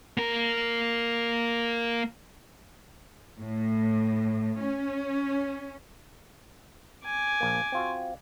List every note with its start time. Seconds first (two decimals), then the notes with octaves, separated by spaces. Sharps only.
0.17 A#3 A#4
3.39 A2
4.59 C#4
7.05 G#5 D6
7.40 A#1 A#3
7.72 C4 F4 F#4